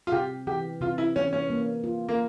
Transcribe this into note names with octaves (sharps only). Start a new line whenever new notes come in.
F4
C3 G4
E3 G4
C3 F4
E4
E3 C#4
C#4
A#3
F4
A#3